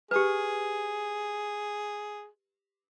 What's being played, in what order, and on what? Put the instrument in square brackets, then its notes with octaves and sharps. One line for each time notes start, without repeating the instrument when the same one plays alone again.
[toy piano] G4 B4 [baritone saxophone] G#4